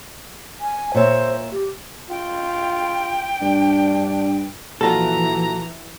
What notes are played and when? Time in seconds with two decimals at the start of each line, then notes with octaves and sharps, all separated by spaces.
0.61 G#5
0.95 A#2 C5 C#5 E5
1.52 G4
2.10 F4 G5
3.42 G2 D4
4.81 A#2 E3 F3 F4 F#4 A4 A#5